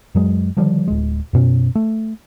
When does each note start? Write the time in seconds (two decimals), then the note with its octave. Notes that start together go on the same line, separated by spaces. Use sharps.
0.15 F#2 F#3 G#3
0.57 D3 D#3 F3 G3
0.88 D1 G#3
1.33 F#2 B2 C#4
1.75 A3